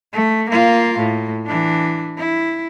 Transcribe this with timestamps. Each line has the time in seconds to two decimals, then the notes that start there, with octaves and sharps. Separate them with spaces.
0.13 A3
0.50 A#3 F4
0.99 A2
1.47 E3 D4
2.18 E4